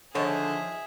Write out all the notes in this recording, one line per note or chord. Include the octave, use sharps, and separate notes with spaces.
D3 D#3 F3 G#4 C#5 E5